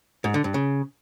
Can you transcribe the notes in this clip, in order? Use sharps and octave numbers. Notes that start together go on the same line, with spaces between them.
G#2
D3
G2
C#3